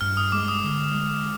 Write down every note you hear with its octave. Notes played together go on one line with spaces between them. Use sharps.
G2 F6
D#6
G#3 D6
D#6
D3
G#3